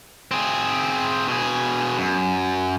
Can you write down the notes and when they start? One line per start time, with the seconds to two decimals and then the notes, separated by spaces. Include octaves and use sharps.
0.31 C4 G#4
1.28 B2 G#4
1.98 F#2